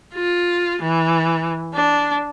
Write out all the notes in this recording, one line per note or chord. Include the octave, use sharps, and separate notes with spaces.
F4
E3
D4